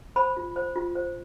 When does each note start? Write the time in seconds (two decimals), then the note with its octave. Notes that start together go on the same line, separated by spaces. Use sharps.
0.16 C5 B5
0.37 F4
0.56 C5
0.76 F4
0.95 C5